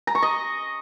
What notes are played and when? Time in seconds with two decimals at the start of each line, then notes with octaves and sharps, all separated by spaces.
0.07 A#5
0.15 C#6
0.23 D#5